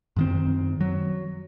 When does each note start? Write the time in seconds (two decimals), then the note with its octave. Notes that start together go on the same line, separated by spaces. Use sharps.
0.16 F#2 D#3 C4
0.81 F#3